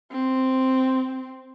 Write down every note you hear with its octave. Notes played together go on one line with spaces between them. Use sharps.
C4